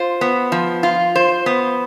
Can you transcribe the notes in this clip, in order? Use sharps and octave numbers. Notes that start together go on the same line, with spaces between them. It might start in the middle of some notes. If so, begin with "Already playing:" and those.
Already playing: F4 C5
B3
F3
F4
C5
B3